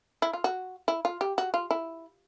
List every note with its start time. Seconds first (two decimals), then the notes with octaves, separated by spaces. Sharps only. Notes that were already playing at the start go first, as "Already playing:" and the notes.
0.22 E4
0.33 F4
0.44 F#4
0.88 E4
1.05 F4
1.21 G4
1.38 F#4
1.54 F4
1.71 E4